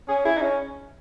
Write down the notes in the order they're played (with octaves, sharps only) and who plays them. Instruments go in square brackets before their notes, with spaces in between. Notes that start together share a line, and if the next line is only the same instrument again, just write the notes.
[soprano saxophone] C#4 [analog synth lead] G#4
[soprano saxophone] E4 [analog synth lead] G#4
[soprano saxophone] D#4
C#4